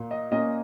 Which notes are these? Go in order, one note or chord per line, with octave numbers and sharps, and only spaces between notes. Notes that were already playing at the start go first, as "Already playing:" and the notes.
Already playing: A#2 A#3
D#5
A#2 A#3 C#4 D#5